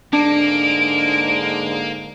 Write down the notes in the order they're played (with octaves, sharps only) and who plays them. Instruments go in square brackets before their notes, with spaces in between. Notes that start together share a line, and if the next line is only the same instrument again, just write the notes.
[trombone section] G#2 D3 G#3 [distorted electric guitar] A#3 [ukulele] D4 [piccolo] D7